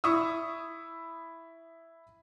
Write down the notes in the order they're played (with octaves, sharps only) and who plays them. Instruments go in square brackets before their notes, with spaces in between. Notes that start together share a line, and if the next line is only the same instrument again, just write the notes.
[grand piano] E4 C#6 D#6 E6